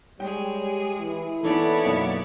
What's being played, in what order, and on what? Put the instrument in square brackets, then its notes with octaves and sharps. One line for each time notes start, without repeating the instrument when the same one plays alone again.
[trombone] G3 [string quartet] G#3 G#4 [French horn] C#5 [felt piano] G5
[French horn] G4
[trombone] E3 [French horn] E4
[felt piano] E3 D#4 [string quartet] B3 C#5 D5 [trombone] A4
[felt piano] F#2 B2 [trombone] A#3